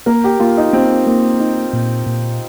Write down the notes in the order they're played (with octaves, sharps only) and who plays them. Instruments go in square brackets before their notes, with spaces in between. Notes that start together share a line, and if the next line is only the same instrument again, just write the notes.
[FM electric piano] A#3 [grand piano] A#4
[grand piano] G4
[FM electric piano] A#3 [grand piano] F4
[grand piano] D#4
[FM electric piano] A#3 [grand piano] C4
[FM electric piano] A#3
D#4
A#2
A#2